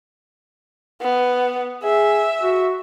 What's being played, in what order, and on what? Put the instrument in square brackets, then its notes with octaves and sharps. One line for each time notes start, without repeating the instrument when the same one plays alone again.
[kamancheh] B3
[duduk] G#4 [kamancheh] E5
[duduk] F#4